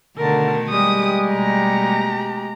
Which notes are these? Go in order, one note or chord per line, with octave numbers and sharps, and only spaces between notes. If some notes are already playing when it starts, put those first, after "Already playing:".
B2 D3 D#3 A3 A#4 A5
G3 G#3 G4 D#6
B2 A3 A#5